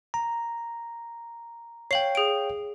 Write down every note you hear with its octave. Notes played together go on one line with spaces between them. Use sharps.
A#5
C#5 F5 G5 C7 F#7
G#4 D7